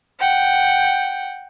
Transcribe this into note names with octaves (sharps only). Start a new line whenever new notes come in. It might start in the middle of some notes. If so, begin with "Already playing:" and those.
F#5 G5